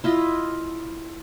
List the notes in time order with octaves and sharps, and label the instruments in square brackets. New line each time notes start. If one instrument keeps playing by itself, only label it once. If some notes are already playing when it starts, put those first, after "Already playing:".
[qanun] E4 F4 D#5